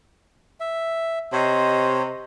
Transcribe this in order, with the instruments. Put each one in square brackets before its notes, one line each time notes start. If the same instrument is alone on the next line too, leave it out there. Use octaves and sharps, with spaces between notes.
[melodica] E5
[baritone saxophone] C3 [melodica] C5 C#5 [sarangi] D#5